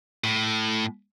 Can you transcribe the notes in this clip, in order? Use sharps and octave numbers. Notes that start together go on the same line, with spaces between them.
A2